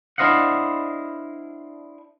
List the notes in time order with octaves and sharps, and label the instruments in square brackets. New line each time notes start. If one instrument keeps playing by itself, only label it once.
[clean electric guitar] D4 E4 C5 D#5 F5 F#5